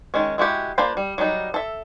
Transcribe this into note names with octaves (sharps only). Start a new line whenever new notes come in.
D#3 G#3 C#4
G#3 E4 F#4 G4
A#3 D4 F4 C5 B5
G3
F#3 G3 D4 D#4
A4 E5